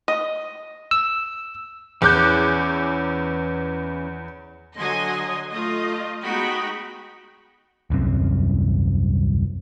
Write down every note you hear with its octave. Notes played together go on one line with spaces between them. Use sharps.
D#5
E6
E2 E3 C#4 D6 F#6 G6
D3 F#3 D#5 G#5 C6
A3 F4 D#5
G#3 B3 D#4 F#4 G5 B5
D#1 C2 F#2 C4